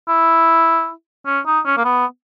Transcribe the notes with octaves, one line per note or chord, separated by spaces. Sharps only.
E4
C#4
D#4
C#4
A#3
B3